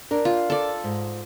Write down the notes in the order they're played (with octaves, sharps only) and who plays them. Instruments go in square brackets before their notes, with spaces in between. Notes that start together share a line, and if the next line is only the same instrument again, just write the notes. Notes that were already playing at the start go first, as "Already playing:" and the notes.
[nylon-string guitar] D4 A#4
[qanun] F4
A4 D5
[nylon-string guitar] G#2